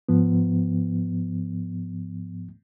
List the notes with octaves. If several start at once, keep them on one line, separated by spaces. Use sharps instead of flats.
G#2 F3 B3